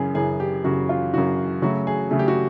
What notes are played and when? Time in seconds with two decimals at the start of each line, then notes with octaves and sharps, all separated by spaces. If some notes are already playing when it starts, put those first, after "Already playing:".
Already playing: F#2 C#3 E3 G#4
0.15 F#2 C#3 E3 G#4
0.40 G4
0.64 F#2 C#3 E3 F#4
0.89 F4
1.13 F#2 C#3 E3 F#4
1.62 C#3 F#3 A3 F#4
1.87 G#4
2.11 C#3 F#3 A3 G#4
2.19 G4
2.28 F#4